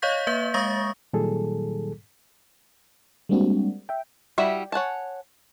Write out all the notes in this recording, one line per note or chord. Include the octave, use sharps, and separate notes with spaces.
C#5 D#5 F5 C#6 G6 B6
A#3 B4 E5 G6
G#3 F5 C#6 D#6 A6 A#6
A#2 D#3 F#3 G3 G#4 A4
G3 G#3 A#3 C4 D4 F#4
E5 G5
G3 E4 F#4 E5
C#5 F#5 G#5 A5